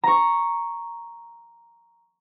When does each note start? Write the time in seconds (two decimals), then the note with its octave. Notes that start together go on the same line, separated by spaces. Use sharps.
0.04 A#5 C#6